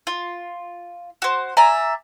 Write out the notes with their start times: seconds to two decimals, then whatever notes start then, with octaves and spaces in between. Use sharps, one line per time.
0.07 F4
1.22 F#4 C5
1.57 D5 E5 G#5 A#5